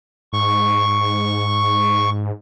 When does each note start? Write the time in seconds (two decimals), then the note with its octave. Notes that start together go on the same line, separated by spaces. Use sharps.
0.33 G#2 C#6